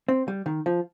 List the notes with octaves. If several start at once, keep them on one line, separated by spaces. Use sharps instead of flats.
C4
G3
D#3
F3